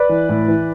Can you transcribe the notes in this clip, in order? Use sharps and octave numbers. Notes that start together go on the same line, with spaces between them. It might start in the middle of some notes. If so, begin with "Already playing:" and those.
Already playing: B4 D5
E3
A2
E3